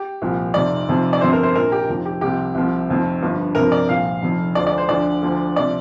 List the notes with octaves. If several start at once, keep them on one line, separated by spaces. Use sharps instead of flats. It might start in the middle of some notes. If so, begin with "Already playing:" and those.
Already playing: G4
C2 A#2 F3
F1 F2 C3 D5
F1 F2 C3 F3
D5
G1 F2 C3 C5
A#4
C5
A#1 A#2 F3 A#4
G4
F1 F2 F3
G4
C2 C3 F3 G4
C2 C3 F3
F1 F2 F3
G1 G2 F3
G1 F2 C3 F3 A#4
D5
C2 A#2 F3 F5
F1 F2 F3
D2 D3 F3 D5
D5
C5
D2 D3 F3 D5
D2 D3 F3
C3 F3 D5